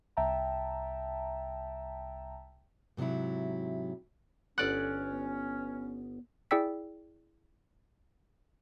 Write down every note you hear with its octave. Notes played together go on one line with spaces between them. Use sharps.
C2 E5 G5 A5 A#5
G#2 C3 F3 F#3 E4
G1 C#4 A4 D5 F#5 F#6
B3
E4 G#4 D5 G5 E6 B6